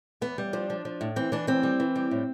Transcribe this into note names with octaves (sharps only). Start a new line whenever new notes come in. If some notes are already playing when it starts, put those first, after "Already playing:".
E2 B3
G3
F3 D4
F3
F3
A2
E3 C4
E3 D4
D2 C4
G3
E3
G3
A2